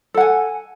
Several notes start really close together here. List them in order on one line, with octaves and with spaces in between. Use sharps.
A4 F#5 G#5